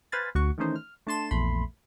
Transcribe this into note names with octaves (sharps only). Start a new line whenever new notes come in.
B4 C5 F5 G#5 B5 A6
D2 F#4 C#6
D#3 E3 A3 C#4 D#4 C5
F6
A3 D4 A5 C6 E7
A#1 E2 A3 B5 C6